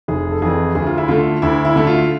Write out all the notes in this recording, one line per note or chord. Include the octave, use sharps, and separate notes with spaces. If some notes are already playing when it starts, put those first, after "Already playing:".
F1 G#4
A4
F2 E3 G#4
D2 G#4
F4
E4
D3 A3 F4
D2 E4
E4
D3 A3
F4